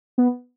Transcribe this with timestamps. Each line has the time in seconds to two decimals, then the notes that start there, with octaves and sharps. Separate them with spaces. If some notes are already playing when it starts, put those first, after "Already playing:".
0.18 B3